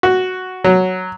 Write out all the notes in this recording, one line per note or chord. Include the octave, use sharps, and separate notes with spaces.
F#4
F#3